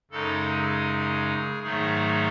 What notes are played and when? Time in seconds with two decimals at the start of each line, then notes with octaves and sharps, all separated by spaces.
0.11 F#2 C#3 G#3 D#4 A4
0.50 G#4
1.63 G#2 D#3 F#3 A3 D#4 G#4